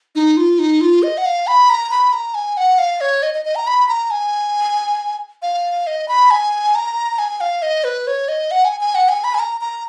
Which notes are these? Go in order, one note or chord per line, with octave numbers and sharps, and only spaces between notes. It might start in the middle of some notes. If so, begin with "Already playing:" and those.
D#4
F4
D#4
F4
D#5
F#5
F5
B5
A#5
B5
A#5
G#5
F#5
F5
C#5
D#5
D#5
D#5
A#5
B5
A#5
G#5
F5
D#5
B5
G#5
A#5
G#5
F5
D#5
B4
C#5
D#5
F#5
G#5
G#5
F#5
G#5
B5
G#5
A#5
A#5